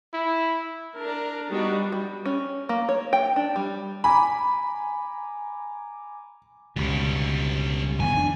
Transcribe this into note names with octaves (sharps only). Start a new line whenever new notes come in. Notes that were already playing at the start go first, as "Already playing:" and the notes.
E4
D4 A#4
G3 B3 D4 D#4 F#4
G3
C#4
A#3
C#5
G5
D4
G3
G#5 A#5 B5 D6
C#2 B2 D3 G3
F2 D#3 B3 G#5
D4